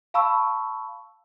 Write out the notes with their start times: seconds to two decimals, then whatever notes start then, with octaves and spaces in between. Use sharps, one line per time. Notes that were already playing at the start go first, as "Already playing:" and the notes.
0.14 F5 A5 B5 C#6 E6